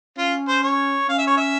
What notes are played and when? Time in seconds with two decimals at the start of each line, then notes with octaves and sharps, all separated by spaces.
0.17 C#4 F4
0.48 C5
0.63 C#5
1.09 C#4 F5
1.18 E5
1.27 C#5
1.37 E5